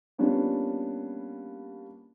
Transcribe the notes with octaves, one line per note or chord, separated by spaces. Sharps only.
G3 A#3 B3 C#4 D4 F4